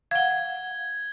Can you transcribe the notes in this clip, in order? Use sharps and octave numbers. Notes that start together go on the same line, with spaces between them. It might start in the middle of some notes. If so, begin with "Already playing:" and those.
F5 F#5 G#6 G7